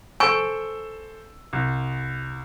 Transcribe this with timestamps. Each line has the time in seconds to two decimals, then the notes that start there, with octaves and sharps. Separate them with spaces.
0.20 A4 C5 G#5 C#6 E6
1.53 C2